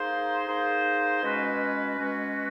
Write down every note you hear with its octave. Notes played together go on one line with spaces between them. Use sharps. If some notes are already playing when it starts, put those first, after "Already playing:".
Already playing: A#3 D#4 G#4 C5
A#3 D#4 G#4 C5
B2 G#3 C#4 F#4 B4
B2 G#3 C#4 F#4 B4